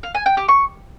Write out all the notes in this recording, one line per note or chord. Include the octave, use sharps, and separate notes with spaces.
F5
G#5
G5
G4
C#6